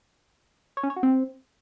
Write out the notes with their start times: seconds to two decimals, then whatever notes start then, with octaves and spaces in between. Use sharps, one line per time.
0.77 C#5
0.83 C#4
0.90 C#5
0.96 F#4
1.03 C4